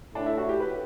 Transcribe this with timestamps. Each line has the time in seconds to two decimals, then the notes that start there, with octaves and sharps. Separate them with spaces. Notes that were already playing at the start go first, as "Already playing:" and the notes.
0.15 A2 D4
0.26 E4
0.38 F#4
0.49 G4
0.60 B4